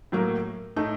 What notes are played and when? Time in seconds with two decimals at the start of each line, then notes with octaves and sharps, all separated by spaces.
0.12 A2 F#3 A#3
0.76 A2 A3 D#4